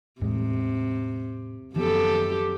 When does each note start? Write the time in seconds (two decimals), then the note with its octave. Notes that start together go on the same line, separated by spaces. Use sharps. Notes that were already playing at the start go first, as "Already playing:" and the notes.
0.21 E2 A2 C3 G#3
1.76 F#2 D#3 F3 B3 G4 A4